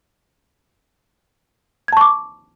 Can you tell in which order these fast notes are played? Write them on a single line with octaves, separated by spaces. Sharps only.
G#6 A5 C#6 D6